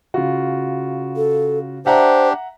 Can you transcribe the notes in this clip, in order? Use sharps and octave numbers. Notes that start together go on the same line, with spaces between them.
C#3 F4 F#4
A4
D4 G4 C5 E5 F#5 A#5